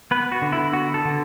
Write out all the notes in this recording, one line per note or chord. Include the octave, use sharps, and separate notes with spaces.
B3 B4
F#4
D3
E4
B3 F#4
A4
D3